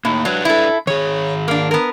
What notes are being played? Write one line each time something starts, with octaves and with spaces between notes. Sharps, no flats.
A2 A#3 D#4
F#3 D4 B4
E4 A4
D#3 G#4 C#5
A#3 D4
B3 A#4